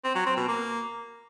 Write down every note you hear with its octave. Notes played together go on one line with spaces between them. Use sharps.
C4
F#3
C4
B2
A#3